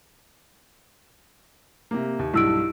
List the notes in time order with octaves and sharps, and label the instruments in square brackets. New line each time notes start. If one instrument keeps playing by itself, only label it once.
[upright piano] C3 A#3
D#2
[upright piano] B1 G2 [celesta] E4 E6 D7